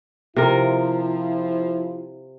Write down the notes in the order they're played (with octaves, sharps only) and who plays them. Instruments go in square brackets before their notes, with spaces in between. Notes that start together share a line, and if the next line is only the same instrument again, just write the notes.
[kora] C3 A#4 [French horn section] F3 E4 F4